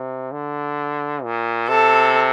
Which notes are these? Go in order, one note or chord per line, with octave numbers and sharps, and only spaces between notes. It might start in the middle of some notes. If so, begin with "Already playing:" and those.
Already playing: C3
D3
A#2
C3 A4